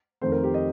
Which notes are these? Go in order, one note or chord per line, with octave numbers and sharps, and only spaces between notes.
F2 D#3 A3 C4 C5
A#4
G4
D#5